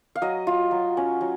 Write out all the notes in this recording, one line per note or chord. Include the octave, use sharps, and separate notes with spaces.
F5
F#3 D#5
F4
F#3
C#4
F#3